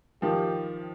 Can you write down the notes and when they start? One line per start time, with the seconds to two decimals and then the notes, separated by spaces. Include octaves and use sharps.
0.22 D#3 F3 G4